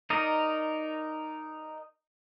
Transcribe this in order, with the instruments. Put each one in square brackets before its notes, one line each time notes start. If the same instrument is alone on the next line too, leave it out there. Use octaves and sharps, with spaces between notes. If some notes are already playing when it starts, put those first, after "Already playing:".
[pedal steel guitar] D#4 A#4 D5 D#5